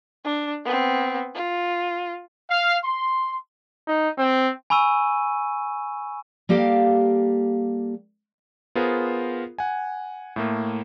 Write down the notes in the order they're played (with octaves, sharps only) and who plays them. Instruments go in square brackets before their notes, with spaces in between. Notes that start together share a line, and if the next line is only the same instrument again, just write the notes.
[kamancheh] D4
B3 C4
F4
[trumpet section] F5
C6
[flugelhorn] D#4
C4
[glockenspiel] G#5 B5 C#6 E6 D#7
[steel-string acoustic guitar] G3 A#3 G4 A4 F5 G5
[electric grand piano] B3 F4 G#4 A#4 C5
F#5 G#5
A2 A3 A#3